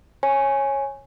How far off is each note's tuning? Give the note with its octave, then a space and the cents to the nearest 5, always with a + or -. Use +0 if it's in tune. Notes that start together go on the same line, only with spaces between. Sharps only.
C#5 -15 G#5 +0